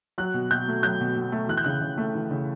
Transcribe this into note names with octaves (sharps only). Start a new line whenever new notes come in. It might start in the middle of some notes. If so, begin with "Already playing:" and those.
F#3 F#6
B2
B2 G6
A3
F#3 G6
B2
B2
A3
E3 F#6
G6
C#3 F#6
C#3
A3
E3
C#3